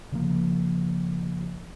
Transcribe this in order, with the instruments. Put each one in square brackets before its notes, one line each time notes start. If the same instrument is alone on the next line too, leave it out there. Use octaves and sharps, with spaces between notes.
[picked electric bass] C#3 F3 A#3